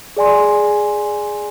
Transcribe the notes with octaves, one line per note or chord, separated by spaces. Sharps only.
G#4 D5 G#5 C6